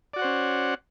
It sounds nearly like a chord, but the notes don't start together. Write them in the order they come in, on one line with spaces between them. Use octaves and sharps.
D5 F#4 F#5 C5 C#4